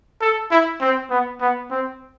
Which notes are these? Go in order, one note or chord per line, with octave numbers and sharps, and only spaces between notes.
A4
E4
C4
B3
B3
C4